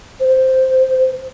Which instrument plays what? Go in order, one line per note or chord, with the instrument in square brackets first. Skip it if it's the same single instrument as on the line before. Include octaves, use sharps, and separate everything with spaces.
[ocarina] C5